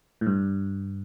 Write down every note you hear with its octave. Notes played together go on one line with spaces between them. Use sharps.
A2
G2